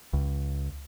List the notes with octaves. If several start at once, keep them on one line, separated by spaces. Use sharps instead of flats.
C#2